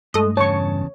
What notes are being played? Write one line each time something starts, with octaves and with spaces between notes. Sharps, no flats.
G2 G#3 A3 D#5
E2 C#3 C#5 A5 C#6